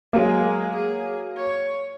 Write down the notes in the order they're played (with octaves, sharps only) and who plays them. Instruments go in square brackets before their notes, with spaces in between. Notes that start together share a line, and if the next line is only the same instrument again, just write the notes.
[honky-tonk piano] F#3 A#3 [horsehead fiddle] G#3
[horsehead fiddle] G#4
C#5